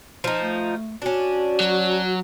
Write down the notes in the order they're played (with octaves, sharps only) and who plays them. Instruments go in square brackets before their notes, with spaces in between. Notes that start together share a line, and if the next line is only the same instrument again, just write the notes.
[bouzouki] F3 D#4
[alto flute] A3
[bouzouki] C#4 D4 [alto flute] F#4
[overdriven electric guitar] F#3